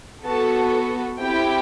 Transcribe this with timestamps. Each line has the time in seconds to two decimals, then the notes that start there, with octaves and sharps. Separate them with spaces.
0.25 B3 F#4 A4 A5
1.19 C4 E4 G4 G5